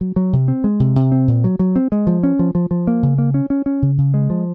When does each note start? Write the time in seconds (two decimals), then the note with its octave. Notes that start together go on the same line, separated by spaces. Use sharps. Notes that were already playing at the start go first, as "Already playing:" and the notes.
0.01 F#3
0.16 F#3
0.33 C3
0.48 C4
0.64 G#3
0.80 C3
0.96 C3
1.12 C4
1.28 A#2
1.44 F#3
1.59 F#3
1.76 C4
1.92 G#3
2.07 F3
2.23 C#4
2.39 F3
2.55 F3
2.71 F3
2.87 A#3
3.03 C#3
3.18 A#3
3.34 C#4
3.50 C#4
3.66 C#4
3.82 C#3
3.98 C#3
4.14 G#3
4.30 F3